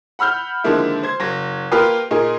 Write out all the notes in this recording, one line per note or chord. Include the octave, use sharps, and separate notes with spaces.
F#5 B5 E6 F6 G6
D3 D#3 F3 G#3 A#3 E4
C5 G#6
F#1 A#6
A#3 F4 G4 A#4 B4 F5
A#2 D#4 G#4 A#4